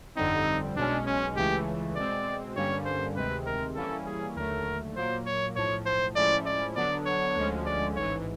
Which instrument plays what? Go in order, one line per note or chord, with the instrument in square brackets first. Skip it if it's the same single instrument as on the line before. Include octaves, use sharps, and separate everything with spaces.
[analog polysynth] G1 F2 D3 G3 C4 [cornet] D#4
[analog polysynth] B1 B2 G#3 C#4 [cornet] D4
[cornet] C#4
[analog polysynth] C#2 C#3 E3 A3 [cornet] G4
[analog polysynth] B2 G#3 C4 [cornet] D5
[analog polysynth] G2 D3 G3 A#3 C#4 [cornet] C#5
[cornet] C5
[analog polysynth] D2 C3 D#3 G#3 C4 [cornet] B4
[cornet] A#4
[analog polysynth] E3 G3 A#3 C#4 E4 [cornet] A4
[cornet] G#4
[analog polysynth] D#2 D3 F#3 A3 [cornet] A#4
[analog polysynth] A#2 F#3 A#3 [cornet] C5
[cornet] C#5
[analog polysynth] B1 A2 F3 [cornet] C#5
[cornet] C5
[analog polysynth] A2 F3 G#3 C#4 E4 [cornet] D5
[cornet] D5
[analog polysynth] D3 F#3 B3 D4 [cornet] D5
[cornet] C#5
[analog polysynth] D2 D3 F3 G#3 C#4
[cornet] D5
[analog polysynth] A1 G#2 E3 [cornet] C#5